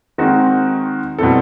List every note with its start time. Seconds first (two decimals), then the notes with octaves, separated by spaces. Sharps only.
0.18 D#3 G#3 C4 D#4 F#4
1.18 B2 G3 C4 E4 A4